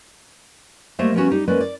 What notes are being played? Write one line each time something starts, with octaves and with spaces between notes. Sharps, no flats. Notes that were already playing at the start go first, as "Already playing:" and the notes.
G3 A3 A#3 C5 D#5 E5
F3 G3 A#3 B3 C#4 F#4
G3 D#4 G4
G#3 A#3 C#4 B4 D5
D5